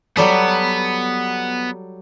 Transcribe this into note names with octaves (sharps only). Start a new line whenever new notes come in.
F#3 G3 B3 A4